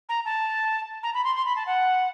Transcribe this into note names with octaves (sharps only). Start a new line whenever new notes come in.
A#5
A5
A#5
B5
C6
C6
B5
A5
F#5